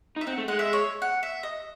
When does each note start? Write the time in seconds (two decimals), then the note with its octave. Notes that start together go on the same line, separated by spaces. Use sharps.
0.16 D#4
0.21 E5
0.27 C4 F#5
0.38 A3
0.48 G#3 F#5
0.59 E5
0.73 C#5
1.02 F#5
1.23 E5
1.43 D#5